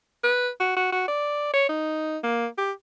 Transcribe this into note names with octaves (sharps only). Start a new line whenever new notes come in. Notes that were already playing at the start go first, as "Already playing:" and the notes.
B4
F#4
F#4
F#4
D5
C#5
D#4
A#3
G4